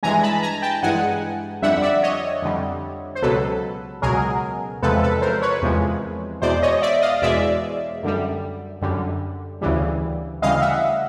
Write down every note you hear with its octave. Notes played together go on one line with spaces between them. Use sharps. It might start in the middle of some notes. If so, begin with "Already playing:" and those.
G2 E3 G#3 G#5 A#5
A5 B5
G#5 A#5
G5 A5
G2 E3 G#3 F#5 G#5
F2 D3 G3 E5 F#5
D5 E5
C#5 D#5
F2 D3 G3
C5
C#2 B2 F#3 A4 B4
C#2 B2 F#3 G#4 A#4
E2 C3 F3 G#3 A4 B4
A4 B4
A#4 C5
B4 C#5
E2 C3 F3 G#3
E2 B2 G#3 C5 D5
C#5 D#5
D5 E5
D#5 F5
E2 B2 G#3 D5 E5
F#2 D3 G3
F#2 D3 G3
D2 C#3 E3 G3
D2 C#3 E3 G3 D#5 F5
E5 F#5